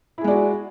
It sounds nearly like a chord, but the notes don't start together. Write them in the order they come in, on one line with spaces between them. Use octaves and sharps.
E4 G#4 G#3 D5 F#4